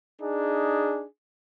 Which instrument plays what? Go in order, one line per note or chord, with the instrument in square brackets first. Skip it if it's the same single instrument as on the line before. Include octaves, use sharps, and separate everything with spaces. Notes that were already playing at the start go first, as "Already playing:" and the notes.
[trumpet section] D4 D#4 G#4